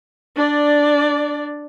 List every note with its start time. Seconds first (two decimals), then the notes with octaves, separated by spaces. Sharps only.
0.36 D4 D5